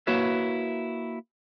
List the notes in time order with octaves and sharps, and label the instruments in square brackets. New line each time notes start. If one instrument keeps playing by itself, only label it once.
[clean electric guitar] A#3 E4 F#4 B4 C#5 E5